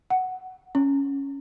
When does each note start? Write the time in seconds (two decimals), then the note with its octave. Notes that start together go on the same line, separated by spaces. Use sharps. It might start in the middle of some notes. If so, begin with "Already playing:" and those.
0.10 F#5
0.75 C#4